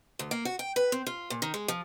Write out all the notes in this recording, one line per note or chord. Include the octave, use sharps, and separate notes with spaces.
D2
A#3
F#4
G5
B4
C4
F4
A#2
D#3
G#3
F3